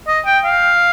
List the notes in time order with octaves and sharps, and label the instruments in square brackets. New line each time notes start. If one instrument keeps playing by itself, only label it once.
[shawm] D#5
G5
F5